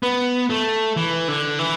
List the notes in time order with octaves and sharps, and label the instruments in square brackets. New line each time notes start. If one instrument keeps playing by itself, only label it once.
[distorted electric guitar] B3
A3
E3
D3
E3